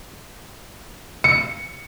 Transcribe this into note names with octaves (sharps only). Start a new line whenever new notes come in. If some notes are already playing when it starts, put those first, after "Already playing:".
C#7